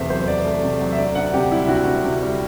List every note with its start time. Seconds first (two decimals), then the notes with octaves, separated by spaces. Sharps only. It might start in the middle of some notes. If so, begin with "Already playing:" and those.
Already playing: E2 C3 A3 C5 E5
0.10 F#3 C5
0.28 E2 D5
0.45 A3
0.63 C3
0.81 F#3
0.92 E5
0.98 D2 D5
1.15 D2 F#5
1.33 C3 G4
1.52 G3 E4
1.68 D2 F#4
1.86 D2
2.04 C3
2.22 G3